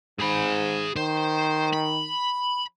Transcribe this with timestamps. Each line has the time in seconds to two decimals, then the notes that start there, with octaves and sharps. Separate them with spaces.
0.19 G#2 G#4 B5
0.96 D#3 C5
1.73 B5